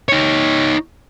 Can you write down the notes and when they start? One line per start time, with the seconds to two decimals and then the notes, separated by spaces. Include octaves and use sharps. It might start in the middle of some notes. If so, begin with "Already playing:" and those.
0.09 D#4 C#5